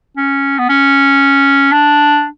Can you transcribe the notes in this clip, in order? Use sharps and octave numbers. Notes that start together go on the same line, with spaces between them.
C#4
B3
C#4
D4